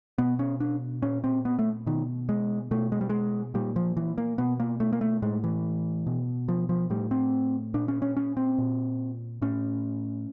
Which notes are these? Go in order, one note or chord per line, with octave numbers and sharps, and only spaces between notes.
B2 B3
C#4
D4
A#2 C#4
C4
B3
A3
B2 D#3
G#3
B2 A3
G#3
G3
G#3
A#2 G3
F3
E3
A#3
B2 B3
A#3
A3
A#3
A3
A2 G#3
E3
B2
F3
F3
A2 G3
C4
A#2 D4
C#4
C#4
C#4
C4
A#2
A2 C#4